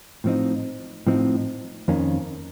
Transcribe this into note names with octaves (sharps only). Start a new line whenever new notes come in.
A2 F3 C4 D#4
A2 F3 C4 D#4
F2 D#3 A#3 C#4